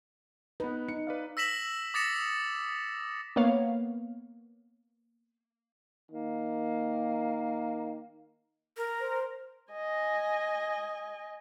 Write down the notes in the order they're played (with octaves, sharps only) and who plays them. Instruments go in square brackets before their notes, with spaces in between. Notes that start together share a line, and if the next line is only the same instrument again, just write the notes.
[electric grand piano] B3 D#4 [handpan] B4
[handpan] D#4 [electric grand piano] C#7
[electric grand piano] B4 D5 F5
[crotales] E6 A#6 B6 E7 F#7
D6 D#6 A6 A#6 C#7 E7
[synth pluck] A#3 B3 C#5 F5
[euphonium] D#3 [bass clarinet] A#3
[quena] A#4
[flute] C5
[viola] D#5 G#5